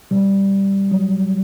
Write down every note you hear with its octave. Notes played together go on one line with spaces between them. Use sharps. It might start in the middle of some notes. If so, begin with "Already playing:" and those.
B2 G3
F#3